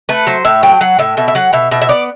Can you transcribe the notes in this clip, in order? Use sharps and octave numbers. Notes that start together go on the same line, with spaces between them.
A3 B4
F#3 C5
A2 E5
F#3 G5
F#3 F#5
A2 E5
B2 E5
E5
F#3 F#5
B2 E5
B2 E5
E5
B3 D5